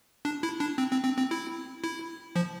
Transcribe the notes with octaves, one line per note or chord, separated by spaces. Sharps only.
D4
E4
D4
C4
C4
C4
C4
E4
E4
F3